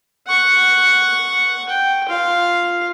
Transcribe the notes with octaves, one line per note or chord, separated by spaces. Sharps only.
F#5 C#6
G5
F4 F5